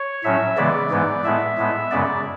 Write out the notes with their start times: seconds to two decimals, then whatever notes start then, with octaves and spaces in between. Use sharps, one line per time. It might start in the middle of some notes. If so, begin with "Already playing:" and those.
Already playing: C#5
0.24 A2 F#3 C#4 E5
0.57 C#3 E3 G#3 B3 D5
0.91 G#2 E3 G#3 B3
1.24 A2 G#3 B3 E5
1.58 A2 G#3 B3
1.91 F#2 C#3 G#3 B3 D5